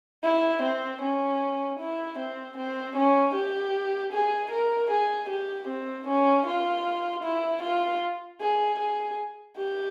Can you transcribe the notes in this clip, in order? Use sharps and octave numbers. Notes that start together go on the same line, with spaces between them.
E4
C4
C#4
E4
C4
C4
C#4
G4
G#4
A#4
G#4
G4
C4
C#4
F4
E4
F4
G#4
G#4
G4